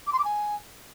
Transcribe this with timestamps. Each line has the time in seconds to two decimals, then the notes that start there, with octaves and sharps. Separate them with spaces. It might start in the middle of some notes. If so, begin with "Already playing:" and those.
0.06 D6
0.12 C6
0.18 D6
0.24 G#5